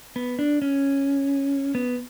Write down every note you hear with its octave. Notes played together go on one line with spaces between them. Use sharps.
B3
D4
C#4
B3